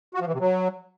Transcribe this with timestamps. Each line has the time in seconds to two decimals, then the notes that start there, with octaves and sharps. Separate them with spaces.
0.14 F#4
0.21 F3
0.27 E3
0.34 C3
0.40 F#3